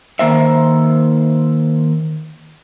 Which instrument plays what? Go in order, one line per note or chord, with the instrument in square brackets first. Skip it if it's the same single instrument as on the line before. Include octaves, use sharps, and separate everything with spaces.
[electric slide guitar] D#3 A#3 C5 E5